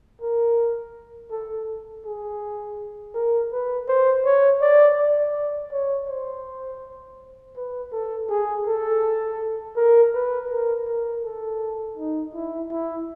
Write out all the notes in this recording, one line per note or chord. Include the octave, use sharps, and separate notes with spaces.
A#4
A4
G#4
A#4
B4
C5
C#5
D5
D5
C#5
C5
B4
A4
G#4
A4
A#4
B4
A#4
A#4
A4
D#4
E4
E4